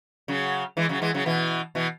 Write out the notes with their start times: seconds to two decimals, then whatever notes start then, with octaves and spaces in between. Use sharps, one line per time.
0.28 C#3 F#3
0.77 E3 G#3
0.89 C#3 F#3
1.02 E3 G#3
1.14 C#3 F#3
1.26 B2 E3
1.75 B2 E3